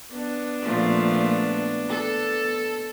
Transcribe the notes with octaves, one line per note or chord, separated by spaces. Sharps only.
B3 D4
A#2 F3 A3
A4